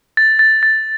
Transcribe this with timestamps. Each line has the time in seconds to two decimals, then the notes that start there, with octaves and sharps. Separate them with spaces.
0.17 A6
0.39 A6
0.63 A6